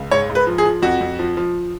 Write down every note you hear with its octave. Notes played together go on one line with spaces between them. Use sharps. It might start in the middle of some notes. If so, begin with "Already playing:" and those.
Already playing: C#2
G#2 C#5
G#2
B4
F3
G#4
F3
F2 F#4
F2
F3
F3